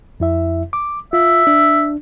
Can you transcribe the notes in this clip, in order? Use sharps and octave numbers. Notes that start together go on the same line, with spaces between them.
F2 E4 E5
D6
F4 E5
D4